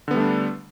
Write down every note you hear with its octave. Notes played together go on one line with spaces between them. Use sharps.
D3 G3 A3 B3 D4